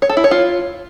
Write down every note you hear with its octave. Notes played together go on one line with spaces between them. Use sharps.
C#5
A4
E4
C#5
F4